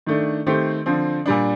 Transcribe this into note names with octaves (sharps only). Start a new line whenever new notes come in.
D#3 A3 D4
D#3 A3 C4 G4
D3 F3 C4
A#2 G3 D4